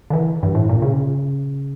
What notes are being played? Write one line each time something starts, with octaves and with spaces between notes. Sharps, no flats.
D3
E3
G2
A2
A#2
C#3